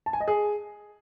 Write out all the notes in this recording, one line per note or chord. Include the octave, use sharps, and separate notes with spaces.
A5
G#5
D#5
G#4